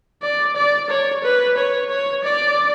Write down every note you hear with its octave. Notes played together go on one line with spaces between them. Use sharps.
D5
D5
C#5
B4
C#5
C#5
D5